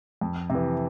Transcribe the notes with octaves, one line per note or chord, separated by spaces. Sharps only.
F2
C3 E3